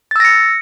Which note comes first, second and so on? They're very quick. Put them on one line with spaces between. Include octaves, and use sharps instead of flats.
A6 E6 A#6 C#7